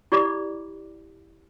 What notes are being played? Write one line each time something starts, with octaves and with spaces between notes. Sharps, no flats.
E4 G4 D5 D#5 B5 D6